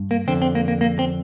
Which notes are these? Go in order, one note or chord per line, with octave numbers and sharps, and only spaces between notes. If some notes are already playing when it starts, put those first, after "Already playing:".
Already playing: G2
A#3
F2 D3 C4
C4
A#3
A#3
A#3
C4